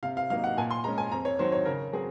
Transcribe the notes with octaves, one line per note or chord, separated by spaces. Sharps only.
C3 F5
F5
F#3 A#3 D#4 F5
F#5
A#2 G#5
C6
G#3 C#4 A#5
G#5
F2 A#5
C#5
D#3 F#3 C4 C5
C#5
C#3 A#4
F#3 C4 G#4